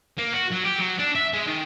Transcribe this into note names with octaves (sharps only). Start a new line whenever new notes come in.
A#3
F#4
F#3
G4
F#3
D4
E5
G#3
D#3